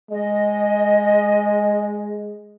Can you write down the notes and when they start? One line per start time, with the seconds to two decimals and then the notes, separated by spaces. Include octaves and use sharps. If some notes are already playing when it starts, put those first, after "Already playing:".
0.11 G#3 D#5